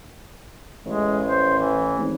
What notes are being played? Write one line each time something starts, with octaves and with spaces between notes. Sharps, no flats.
A1 G#3
C5
E3
G#1